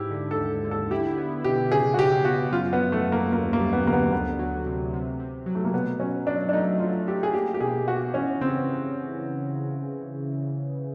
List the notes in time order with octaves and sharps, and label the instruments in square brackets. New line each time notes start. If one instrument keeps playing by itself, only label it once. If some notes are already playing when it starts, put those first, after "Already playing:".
Already playing: [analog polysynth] G#2 [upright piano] E4 G4
[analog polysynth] D3
[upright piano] A4
[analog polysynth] D#2
D3
[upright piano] A4
[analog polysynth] E4 [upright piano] G4
[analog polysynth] B3
[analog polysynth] B2 [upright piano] G4
[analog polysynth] C#3 [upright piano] G#4
[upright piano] F#4
[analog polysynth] C#3 [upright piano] G4
[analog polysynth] B3 [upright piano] F#4
[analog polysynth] F#2 [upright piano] F4
[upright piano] B3
[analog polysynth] F#2
[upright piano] A3
[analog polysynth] F#2
[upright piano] A#3
[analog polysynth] D#2 [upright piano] A#3
[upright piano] A#3
[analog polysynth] G3
[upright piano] B3
[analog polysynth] D3 [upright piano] A#3
[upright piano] B3
[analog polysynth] D2 [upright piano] B3
[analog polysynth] F#3
C3
C3
C3
F#3
[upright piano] A3
A#3
[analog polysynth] B2 [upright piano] B3
[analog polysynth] F#3 [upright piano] C#4
[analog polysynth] F#3 [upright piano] D4
[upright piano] D4
[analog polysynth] A3 [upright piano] D#4
[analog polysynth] F#3 [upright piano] F4
[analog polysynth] A3 [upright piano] G4
[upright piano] G#4
[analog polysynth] A#3 [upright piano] G4
[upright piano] G4
[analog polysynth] B2 [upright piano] G#4
[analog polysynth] A#3 [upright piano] F#4
[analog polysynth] E3 [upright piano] C#4
[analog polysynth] C#3 [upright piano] C4